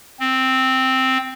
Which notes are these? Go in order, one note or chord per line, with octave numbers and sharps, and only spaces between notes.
C4